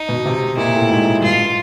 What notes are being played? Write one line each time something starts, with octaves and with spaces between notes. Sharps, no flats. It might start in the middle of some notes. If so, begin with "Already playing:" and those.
Already playing: D#4
B2
C3
A#2 E4
A2
G#2
G2 F4